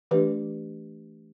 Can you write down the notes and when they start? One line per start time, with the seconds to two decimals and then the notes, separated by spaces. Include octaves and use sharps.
0.11 E3 A3 D4 G4 B4